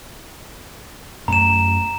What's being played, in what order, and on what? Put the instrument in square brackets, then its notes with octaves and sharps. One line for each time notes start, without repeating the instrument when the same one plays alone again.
[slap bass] F#2 A3 C#4 [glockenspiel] A#5 E7